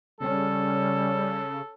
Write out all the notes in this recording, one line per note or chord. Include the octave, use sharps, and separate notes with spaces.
C#3 G3 C#4 A4